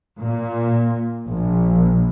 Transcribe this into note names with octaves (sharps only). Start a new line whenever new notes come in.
A#2
A#1